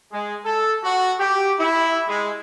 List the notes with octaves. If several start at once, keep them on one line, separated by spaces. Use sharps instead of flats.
G#3
A4
F#4
G4
E4
G#3